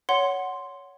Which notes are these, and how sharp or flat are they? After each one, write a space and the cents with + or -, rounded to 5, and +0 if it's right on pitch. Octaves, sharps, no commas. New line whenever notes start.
C#5 +15 F#5 +0 C6 +0